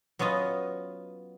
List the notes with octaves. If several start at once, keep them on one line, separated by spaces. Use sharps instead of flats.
F#3 B3 C#4 F4 D#5